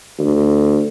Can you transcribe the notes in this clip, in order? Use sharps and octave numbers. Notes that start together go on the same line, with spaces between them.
D2